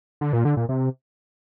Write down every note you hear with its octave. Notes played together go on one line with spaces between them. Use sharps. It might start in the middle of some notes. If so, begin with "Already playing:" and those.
D3
A#2
D3
A#2
C3